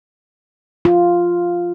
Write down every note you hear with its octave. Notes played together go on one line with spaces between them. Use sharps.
F4